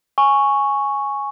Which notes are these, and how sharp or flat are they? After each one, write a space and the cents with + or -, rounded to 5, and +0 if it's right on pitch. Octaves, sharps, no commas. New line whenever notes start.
G#5 +0 C#6 +0